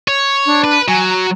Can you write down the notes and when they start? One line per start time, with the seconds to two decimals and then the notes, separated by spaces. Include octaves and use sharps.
0.08 C#5
0.46 D4
0.64 B4
0.88 F#3 G#5
1.10 A#5